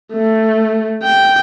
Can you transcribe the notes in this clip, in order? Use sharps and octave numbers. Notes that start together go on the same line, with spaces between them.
A3
G5